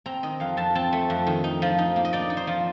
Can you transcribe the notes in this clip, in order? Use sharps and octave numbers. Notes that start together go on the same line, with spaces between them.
C4 A#5
D#3 D#5
F2 F5
F2 A5
C4 A5
A3
F2
D#3
D#4
F3
D#4
A#3
D#5
D#4 D5
D#4
C5
F3